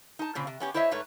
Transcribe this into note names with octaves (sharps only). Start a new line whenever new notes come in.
D#4 A5
A#2 C#3 C4
C3
B3 C#4 G4
E4 C5 C#5 D#5 E5
G#2 A3 B4 C#5